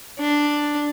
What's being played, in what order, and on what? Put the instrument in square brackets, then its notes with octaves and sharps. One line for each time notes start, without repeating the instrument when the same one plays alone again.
[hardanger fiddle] D4